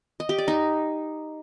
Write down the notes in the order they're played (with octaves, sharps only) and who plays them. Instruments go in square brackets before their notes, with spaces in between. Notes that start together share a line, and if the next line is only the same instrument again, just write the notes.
[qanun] D#5
G4
D5
D#4